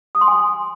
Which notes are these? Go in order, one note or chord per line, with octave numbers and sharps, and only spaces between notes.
D#6
C6
G#5